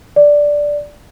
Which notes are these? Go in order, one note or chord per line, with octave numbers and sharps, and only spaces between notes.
D5